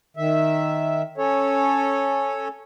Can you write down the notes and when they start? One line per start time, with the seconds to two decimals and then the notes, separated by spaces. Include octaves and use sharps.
0.17 D#3 E5
1.17 C#4 A4 C#5